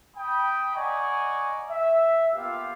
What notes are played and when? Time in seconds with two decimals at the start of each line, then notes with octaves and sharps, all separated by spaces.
0.16 G5 B5 D#6
0.76 D5 D#5 F#5 G#5 A#5 C#6
1.70 E5
2.34 A#3 B3 F4 G4 E5 F5